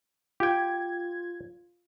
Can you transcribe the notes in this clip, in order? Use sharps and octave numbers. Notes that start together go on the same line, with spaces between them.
F4 G4 G5 G#6